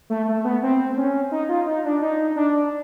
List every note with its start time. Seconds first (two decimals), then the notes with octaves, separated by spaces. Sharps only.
0.10 A3
0.28 A3
0.44 B3
0.63 C4
0.97 C#4
1.31 D#4
1.49 F4
1.66 D#4
1.85 D4
2.02 D#4
2.36 D4